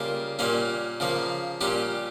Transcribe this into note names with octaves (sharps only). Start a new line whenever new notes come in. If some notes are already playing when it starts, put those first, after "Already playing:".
Already playing: C#3 G3 A#3 F4 A#4
A#2 G3 A#3 C#4
C#3 F3 A#3
A#2 G3 C#4 G4